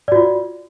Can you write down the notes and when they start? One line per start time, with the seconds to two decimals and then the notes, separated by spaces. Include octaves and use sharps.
0.08 D5
0.12 F#4
0.16 F4